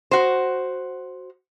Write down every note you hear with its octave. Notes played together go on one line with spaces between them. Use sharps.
F#4 C5